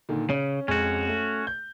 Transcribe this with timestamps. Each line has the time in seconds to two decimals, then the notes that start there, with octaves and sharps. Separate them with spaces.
0.09 A#2 D3 D#3
0.30 C#3 C#4
0.68 F2 G#3 C#4 F#4
1.08 A3
1.47 G6